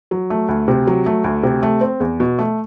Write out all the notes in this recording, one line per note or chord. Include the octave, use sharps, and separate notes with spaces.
F#3
A3
D2
C3
F#3
A3
D2
C3
A3
C4
E2
B2
A3